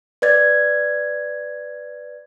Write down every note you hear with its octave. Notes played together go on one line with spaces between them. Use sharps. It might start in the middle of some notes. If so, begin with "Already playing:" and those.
B4 D5 G#6 A6